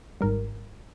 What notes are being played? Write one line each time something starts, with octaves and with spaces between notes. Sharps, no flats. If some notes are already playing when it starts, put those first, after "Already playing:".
G#1 G#2 G3 A#4